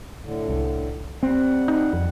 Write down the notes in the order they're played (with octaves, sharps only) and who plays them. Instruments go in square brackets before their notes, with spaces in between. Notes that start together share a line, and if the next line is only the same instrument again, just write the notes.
[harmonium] A2 D3
[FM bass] C2
[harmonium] G3 F#5 [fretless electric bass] C4
[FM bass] D#4
F2